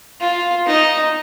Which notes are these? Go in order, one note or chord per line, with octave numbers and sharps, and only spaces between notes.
F4
D#4